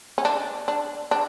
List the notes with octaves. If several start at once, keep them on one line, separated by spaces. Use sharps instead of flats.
C#4
D4
D4
D4